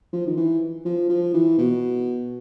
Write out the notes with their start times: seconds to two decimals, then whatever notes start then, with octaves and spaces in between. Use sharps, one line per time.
0.13 F3
0.27 D#3
0.37 E3
0.85 F3
1.10 F3
1.34 E3
1.58 B2